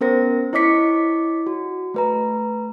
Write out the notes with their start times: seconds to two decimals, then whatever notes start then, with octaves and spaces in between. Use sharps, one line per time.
0.01 B3 C#4 A#4 C5 A#6
0.53 E4 C#5 D#5 D6 B6 C#7
1.47 F#4
1.94 A3 B4 A#5